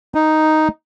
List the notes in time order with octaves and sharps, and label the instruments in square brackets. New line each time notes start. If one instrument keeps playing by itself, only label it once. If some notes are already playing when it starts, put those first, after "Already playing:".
[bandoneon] D#4